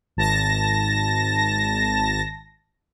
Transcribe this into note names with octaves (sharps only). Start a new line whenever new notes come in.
G#1 A5 A#6